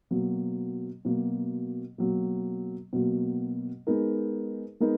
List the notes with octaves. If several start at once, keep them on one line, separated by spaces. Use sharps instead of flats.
B2 F#3 A#3
B2 F#3 A#3
B2 F#3 A#3
B2 F#3 A#3
G#3 B3 D#4 A#4
G#3 B3 D#4 A#4